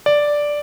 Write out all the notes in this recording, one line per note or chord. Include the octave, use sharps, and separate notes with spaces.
D5